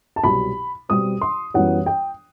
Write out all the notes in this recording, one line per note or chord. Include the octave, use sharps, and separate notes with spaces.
A5
C2 B2 F#3 B5
B2 G3 C4 D#6
C6
F#2 E3 G3 B3 F#5
G5